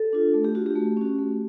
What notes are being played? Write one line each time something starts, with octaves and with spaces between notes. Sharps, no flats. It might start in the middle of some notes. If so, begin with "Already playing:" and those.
Already playing: A4
D4 F4
A3
G4
D4 F4 F#4
G4
A3
C#4 F#4
A3